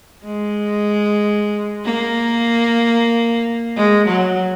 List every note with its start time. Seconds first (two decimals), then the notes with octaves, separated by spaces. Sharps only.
0.25 G#3
1.85 A#3
3.76 G#3
4.07 F#3